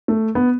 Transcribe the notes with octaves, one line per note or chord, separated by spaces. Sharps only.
A3
B3